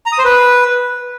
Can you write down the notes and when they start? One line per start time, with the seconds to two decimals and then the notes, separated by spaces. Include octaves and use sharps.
0.06 A#5
0.12 D#6
0.19 C5
0.25 B4